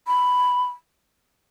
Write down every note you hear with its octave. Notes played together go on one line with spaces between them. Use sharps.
B5